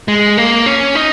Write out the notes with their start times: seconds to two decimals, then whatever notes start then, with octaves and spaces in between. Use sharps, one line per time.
0.08 G#3
0.37 A#3
0.66 C#4
0.95 D#4